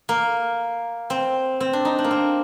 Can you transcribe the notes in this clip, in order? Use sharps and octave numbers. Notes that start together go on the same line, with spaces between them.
A#3
C4
C4
D4
D#4
D4
A#3
C4